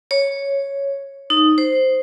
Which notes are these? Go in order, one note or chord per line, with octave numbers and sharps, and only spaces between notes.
C#5
D#4
C5